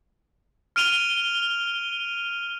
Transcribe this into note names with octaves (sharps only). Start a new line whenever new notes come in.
F6 D7 D#7 F7 G7